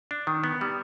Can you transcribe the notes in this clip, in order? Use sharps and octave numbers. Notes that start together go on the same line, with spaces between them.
D4
D#3
B3
G3